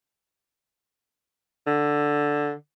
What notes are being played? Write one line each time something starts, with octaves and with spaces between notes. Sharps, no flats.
D3